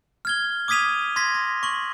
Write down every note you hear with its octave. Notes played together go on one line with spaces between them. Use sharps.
F6 G#6 G7
D6 D#6 G#6 B6 D#7 F7
C6 G#6 A#6 B6
A#6
C#6 F#7